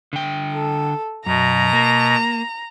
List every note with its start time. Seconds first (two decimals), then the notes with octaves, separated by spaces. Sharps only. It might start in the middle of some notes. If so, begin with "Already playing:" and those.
0.13 D3 G5
0.53 A4
1.26 F#2 B2 A#5
1.73 A#3